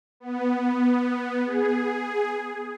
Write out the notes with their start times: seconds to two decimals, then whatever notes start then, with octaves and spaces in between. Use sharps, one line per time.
0.20 B3
1.46 G#4